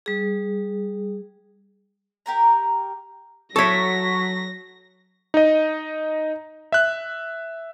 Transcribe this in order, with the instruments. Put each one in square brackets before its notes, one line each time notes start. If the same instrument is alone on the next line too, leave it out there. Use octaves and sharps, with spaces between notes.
[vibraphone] G3 G#4
[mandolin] G4 A#4 A#5
[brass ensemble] F#3 [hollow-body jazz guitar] A4 C#5 [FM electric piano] C#6 B6 [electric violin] A#6
[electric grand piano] D#4 D#5
E5 F#6